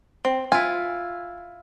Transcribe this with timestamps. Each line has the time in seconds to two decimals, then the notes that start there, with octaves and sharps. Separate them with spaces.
0.25 C4
0.52 E4 F4 G#5